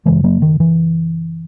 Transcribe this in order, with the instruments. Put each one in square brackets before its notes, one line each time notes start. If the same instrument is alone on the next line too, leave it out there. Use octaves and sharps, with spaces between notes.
[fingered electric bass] F#2 C#3 E3 G#3
F#3 A#3
D#3
E3